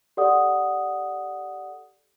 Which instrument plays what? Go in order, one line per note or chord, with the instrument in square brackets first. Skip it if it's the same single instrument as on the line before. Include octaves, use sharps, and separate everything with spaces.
[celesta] G4 A4 D5 F#5 D#6